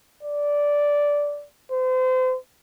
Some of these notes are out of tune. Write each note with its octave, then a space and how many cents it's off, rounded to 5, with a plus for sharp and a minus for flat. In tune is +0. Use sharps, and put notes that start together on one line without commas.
D5 -10
C5 -35